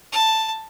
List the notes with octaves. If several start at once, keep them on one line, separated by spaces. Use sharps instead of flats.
A5